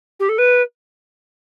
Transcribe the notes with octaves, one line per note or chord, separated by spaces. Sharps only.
G4
A4
B4